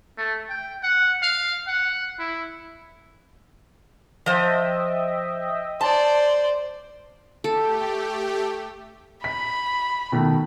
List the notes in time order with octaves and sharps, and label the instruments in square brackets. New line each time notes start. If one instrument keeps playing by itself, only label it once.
[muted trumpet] A3
G5
F#5
F5
F#5
E4
[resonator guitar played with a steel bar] F3 C5 [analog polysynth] D#5 E5 G5
[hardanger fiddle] C5 D5 [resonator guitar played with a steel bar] A5
[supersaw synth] A3 G4 [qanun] A4
[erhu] B5 [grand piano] B6
[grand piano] B2 D#3 A3